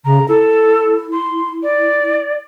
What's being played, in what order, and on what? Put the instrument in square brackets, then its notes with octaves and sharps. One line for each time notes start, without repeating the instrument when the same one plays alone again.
[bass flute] C#3 [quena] A#5
[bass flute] E4 [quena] A4
[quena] C6
D5